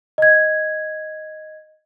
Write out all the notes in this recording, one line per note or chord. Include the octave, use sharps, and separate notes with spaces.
D#5 G#6